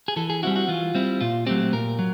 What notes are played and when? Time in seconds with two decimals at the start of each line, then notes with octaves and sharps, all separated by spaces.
0.08 G#4
0.16 E3 A4
0.30 G#4
0.43 G3 C4 E4 F#4
0.56 F#4
0.68 E3 F4
0.95 G3 C4 E4
1.21 A#2 F4
1.47 F#3 A3 C4 G4
1.73 A#2 A#4
1.99 F#3